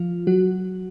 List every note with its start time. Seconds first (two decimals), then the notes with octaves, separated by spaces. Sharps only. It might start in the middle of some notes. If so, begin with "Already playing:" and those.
Already playing: F3 F4
0.27 F#3 F#4